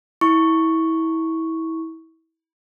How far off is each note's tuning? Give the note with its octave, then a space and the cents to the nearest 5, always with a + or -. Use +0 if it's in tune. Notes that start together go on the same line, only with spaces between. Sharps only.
E4 -25 C#6 +0